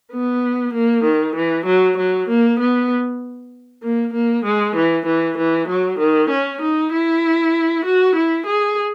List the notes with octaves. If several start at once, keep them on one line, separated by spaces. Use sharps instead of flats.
B3
A#3
D#3
E3
F#3
F#3
A#3
B3
A#3
A#3
G#3
E3
E3
E3
F#3
D#3
C#4
D#4
E4
F#4
E4
G#4